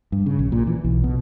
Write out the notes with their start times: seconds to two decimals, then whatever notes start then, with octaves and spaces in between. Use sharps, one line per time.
0.12 G2
0.26 C#3
0.39 A#1
0.52 A#2
0.67 E3
0.84 B1
1.04 B2